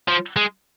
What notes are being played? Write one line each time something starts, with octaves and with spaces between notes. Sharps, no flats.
F3
G#3